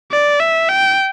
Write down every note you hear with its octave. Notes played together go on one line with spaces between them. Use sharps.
D5
E5
G5